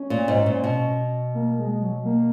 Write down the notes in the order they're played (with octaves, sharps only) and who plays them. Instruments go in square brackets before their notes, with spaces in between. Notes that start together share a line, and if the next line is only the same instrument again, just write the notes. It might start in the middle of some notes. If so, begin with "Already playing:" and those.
Already playing: [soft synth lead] C#4
[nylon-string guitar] A#2
G#2
A#2
B2
[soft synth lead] A#3
G#3
F#3
A#3